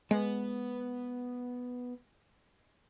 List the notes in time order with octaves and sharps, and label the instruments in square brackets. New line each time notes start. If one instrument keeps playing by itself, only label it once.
[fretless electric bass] G#3 [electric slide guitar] B3 B4